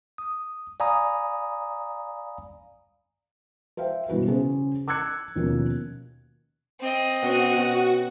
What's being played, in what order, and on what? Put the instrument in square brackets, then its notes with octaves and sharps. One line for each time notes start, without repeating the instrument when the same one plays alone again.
[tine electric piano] D#6
D5 F5 G#5 A#5 B5 D#6
[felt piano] C5 E5 F5 G5
G1 B2 E3 F#4 B4
C#3 C#4 G#4 C5
D6 E6 F#6 G#6 C#7
D#2 B2 F3 A#3 C#4
[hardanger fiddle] C4 D#5
[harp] B2 C#4 C#5 [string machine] F#4
[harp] B2